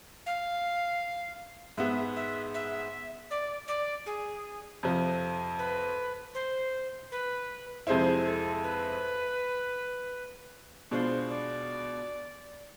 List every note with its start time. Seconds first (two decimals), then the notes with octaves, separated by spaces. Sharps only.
0.26 F5
1.77 G#2 G#3 B3 E5
2.16 E5
2.54 E5
3.31 D5
3.68 D5
4.06 G#4
4.83 F2 C3 F3
5.59 B4
6.35 C5
7.12 B4
7.87 F2 C3 G#3 C4 E4 C5
8.25 A4
8.63 B4
10.91 B2 G#3 D4 F4 C5
11.30 D5